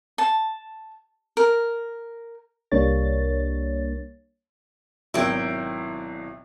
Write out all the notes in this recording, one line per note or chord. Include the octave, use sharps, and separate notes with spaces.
A5
A#4
C2 G3 A#3 D4 C#5 A6
G#1 B2 F#3 E4 G5